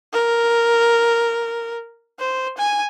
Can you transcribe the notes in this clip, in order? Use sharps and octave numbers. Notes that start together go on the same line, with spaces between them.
A#4
C5
G#5